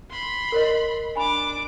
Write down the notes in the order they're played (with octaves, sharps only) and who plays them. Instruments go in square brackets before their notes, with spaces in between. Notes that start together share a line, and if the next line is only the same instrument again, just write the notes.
[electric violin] B5 C6
[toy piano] A#4 C#5 D#5
[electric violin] D4 D6 [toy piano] G#5 B5